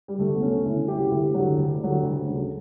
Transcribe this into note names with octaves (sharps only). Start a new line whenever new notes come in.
G3
D2 A3
B3
C#3 F#3 A3 C#4
D2 C#4 E4
C#3 F#3 E4 G4
F#4
D2 E4 G4
D3 F#3
D2
D3 F#3
D2
C#3 F#3